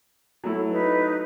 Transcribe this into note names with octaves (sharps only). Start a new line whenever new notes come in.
F#3 A3 E4
D#4 B4